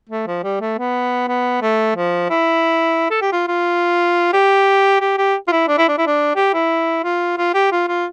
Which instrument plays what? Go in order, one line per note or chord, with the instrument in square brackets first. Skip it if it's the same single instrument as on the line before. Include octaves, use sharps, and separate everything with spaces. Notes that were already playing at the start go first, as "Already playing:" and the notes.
[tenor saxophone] A3
F3
G3
A3
B3
B3
A3
F3
E4
A4
G4
F4
F4
G4
G4
G4
F4
E4
D4
E4
D4
E4
D4
G4
E4
F4
F4
G4
F4
F4